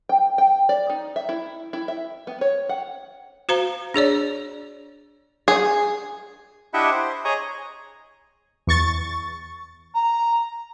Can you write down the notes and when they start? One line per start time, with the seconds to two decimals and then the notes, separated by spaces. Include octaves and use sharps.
0.09 G5
0.38 G5
0.69 D5
0.90 D#4
1.16 E5
1.29 E4
1.73 E4
1.88 E5
2.27 B3
2.41 C#5
2.69 F#5
3.49 F#4 C5 F5 A#5
3.94 D4 G#4 C#5 D5
5.48 G#4
6.74 D4 E4 G4 D#5 E5 F#5
6.91 C5
7.25 G#4 C#5 D#5 G#5 A#5
8.67 E2 C#6 A6
9.95 A#5